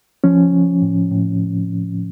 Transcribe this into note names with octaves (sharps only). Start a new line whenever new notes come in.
F3 C#4
F3
A2
A2